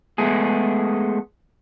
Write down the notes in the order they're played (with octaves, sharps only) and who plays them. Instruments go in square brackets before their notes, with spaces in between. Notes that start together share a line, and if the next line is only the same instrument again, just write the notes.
[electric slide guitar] G#3 A3 B3 G#4